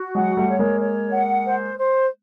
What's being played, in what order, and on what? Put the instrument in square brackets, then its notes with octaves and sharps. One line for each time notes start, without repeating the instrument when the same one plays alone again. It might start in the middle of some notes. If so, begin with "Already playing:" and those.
Already playing: [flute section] F#4
[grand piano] F#3 G#3 [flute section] F#5
[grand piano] G3 A3
[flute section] C#5
[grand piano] G#3 A#3
[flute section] C#5
F#5
C5
C5